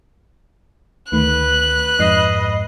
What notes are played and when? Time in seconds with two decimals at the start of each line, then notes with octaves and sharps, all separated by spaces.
1.12 D2 D#3 A3 B4 F#6
1.99 F2 G#2 D#5 C7